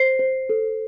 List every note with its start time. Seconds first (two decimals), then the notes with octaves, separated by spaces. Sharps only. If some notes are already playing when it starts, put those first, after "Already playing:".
Already playing: C5 C7
0.19 C5
0.49 A4